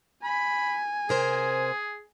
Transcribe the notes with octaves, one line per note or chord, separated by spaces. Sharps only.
G#5 B5
C3 G#4 A#4 C5